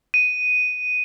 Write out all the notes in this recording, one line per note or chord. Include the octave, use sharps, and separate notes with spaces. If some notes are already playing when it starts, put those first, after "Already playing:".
D#7